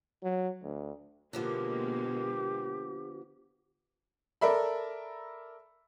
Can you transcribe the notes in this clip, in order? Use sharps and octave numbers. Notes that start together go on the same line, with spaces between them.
F#3
D2
B2 D3 F3 G#3 A#3 B3 G4
A4 A#4 D5 E5 B5